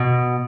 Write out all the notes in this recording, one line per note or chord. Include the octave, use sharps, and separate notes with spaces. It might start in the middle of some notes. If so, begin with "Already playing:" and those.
Already playing: B2